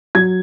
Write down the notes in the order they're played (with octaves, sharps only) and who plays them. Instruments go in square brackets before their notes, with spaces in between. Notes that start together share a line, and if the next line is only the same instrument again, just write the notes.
[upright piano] F#3 G#6